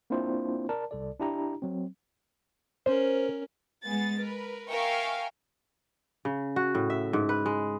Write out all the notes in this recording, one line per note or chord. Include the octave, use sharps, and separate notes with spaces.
A#3 C4 D4 E4 F4 C5
A#4 D5 A5
C2 A4 D5
D4 E4 G4 A#5
F#3 C4
C#4 A#4 C5
G#3 B3 G#4 A6
A#4 B4
A#4 E5 F5 G5 G#5 C#6
C#3
F#4
A2
E5
G#2
B4
G#3